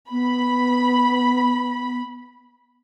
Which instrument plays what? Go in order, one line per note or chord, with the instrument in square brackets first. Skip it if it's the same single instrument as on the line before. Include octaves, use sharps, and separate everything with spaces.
[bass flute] B3 [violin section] B5